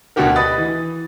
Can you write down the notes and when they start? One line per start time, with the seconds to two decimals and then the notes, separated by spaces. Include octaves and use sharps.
0.16 D2 B2 D4 F#4 G4 A#4
0.36 B4 D#5 D#6 A6
0.58 E3